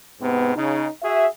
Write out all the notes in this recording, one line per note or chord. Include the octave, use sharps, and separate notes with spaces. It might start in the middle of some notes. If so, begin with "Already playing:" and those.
G#2 C3 B3
C#3 D#4
F#4 G#4 E5